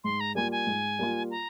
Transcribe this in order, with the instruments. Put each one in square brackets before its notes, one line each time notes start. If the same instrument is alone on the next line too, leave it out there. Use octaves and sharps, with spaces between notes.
[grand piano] G#2 [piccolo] C6
[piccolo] A#5
[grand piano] G3 A#3 F4 [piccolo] G#5
[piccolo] G#5
[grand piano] G#2
G3 A#3 F4
[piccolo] A#5